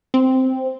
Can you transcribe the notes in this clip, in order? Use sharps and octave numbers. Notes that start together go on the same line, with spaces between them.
C4